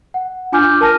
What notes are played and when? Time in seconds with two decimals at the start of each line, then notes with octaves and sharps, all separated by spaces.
0.14 F#5
0.52 D4 F4 G#5 D6 F6 G6
0.81 A#4 A5 F6 A#6 D#7